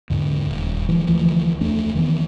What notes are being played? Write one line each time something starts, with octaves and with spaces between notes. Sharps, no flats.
E2 G#2 D3
D#1
E3 F3 G#3
D2 E3 F3 A3
E2 A3 D4
D#3 E3 B3